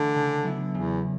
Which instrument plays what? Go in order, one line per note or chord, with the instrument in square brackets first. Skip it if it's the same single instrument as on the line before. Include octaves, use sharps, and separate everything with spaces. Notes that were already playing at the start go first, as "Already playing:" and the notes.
Already playing: [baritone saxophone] D3 [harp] E3 A3 E4
[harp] C#3
F#3 B3 E4
[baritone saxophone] E2 [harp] C#3